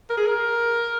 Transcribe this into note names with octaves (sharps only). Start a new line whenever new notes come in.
A#4
G#4
A#4